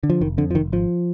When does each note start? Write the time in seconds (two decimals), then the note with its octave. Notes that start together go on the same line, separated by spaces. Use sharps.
0.03 D3
0.10 F3
0.21 F1 D#3
0.38 F2 D3
0.51 F3
0.55 F1 D#3
0.72 G#1 F3